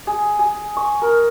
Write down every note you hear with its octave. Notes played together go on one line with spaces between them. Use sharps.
G#4
G#4
C#6
A#4